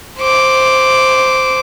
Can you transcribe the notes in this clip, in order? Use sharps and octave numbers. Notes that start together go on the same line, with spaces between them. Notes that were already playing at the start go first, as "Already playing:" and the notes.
C5 D6